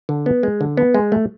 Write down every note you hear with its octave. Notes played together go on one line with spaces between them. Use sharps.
D3
B3
G#3
D3
B3
G#3
A3